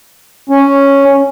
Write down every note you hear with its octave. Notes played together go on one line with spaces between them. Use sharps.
C#4